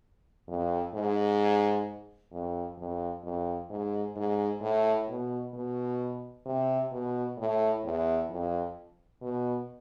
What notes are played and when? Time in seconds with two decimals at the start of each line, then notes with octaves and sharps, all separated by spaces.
0.48 F2
0.94 G#2
2.32 F2
2.78 F2
3.24 F2
3.70 G#2
4.16 G#2
4.62 A2
5.08 B2
5.54 B2
6.46 C3
6.92 B2
7.38 A2
7.84 E2
8.30 F2
9.22 B2